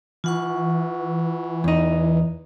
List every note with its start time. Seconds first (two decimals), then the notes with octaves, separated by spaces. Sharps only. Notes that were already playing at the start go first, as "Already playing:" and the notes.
0.24 E3 F4 F#5 C#6
1.64 E2 D#4